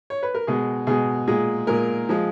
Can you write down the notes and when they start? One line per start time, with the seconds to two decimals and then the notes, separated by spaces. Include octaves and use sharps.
0.10 C#5
0.23 B4
0.34 A#4
0.47 B2 G#3 G#4
0.87 B2 G#3 G#4
1.27 A#2 G#3 G#4
1.67 A#2 G#3 A#4
2.09 F3 G#3